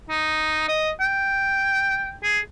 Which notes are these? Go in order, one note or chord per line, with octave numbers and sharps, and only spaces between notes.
D#4
D#5
G5
G#4